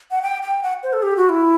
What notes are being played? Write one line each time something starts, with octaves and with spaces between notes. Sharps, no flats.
F#5
G5
G5
F#5
C5
A4
G4
F#4
E4